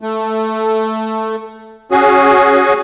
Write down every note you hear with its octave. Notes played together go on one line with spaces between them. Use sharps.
A3
C#4 F#4 G#4